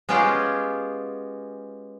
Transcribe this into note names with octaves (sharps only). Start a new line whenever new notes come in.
G#3 B3 C#4 F4 G4 G#4